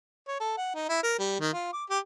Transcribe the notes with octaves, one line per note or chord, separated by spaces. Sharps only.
C#5
A4
F#5
D#4
E4
A#4
G3
D#3
F4
D6
G4